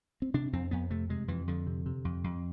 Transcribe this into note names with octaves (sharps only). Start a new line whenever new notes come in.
C4
C3 D4
F2 C4
F2 B3
C3 A3
C3 G#3
F2 E3
F2 D3
C3
C3
F2
F2